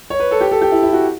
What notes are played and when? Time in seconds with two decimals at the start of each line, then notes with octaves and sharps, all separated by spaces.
0.10 C#5
0.20 B4
0.31 A4
0.41 G4
0.51 A4
0.61 G4
0.72 E4
0.83 E4
0.93 F#4